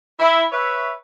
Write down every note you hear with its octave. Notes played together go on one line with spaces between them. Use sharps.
E4
B4 C#5 E5